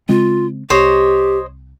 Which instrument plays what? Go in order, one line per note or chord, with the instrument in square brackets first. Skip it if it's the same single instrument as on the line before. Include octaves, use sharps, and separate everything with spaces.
[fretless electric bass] C#3 G#3 C4 [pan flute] F4
[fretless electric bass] C2 [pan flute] G4 [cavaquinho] C5 C#5 D#5